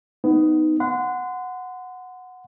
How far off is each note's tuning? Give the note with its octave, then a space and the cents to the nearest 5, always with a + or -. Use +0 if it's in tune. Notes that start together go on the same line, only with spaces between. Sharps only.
B3 +20 D#4 +0
F#5 -10 C6 -35